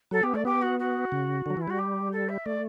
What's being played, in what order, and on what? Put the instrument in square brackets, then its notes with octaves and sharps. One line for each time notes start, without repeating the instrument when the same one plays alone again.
[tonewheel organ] F#3 [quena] A4
[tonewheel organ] B3 [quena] G4
[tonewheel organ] A3 [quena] D5
[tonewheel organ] B3 [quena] G4
[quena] F#4
F#4
[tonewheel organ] C#3
D3 F#3
[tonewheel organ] E3 [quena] E4
[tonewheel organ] G3 [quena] F#4
[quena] G4
A4
E5
[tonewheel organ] A3 [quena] D5